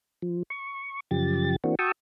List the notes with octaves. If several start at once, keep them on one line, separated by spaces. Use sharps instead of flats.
F3
C#6
F#2 C#3 F3 G4 A6
E3 A#3 C4 D4 F#4
F#4 G5 A5 C#6 D#6 E6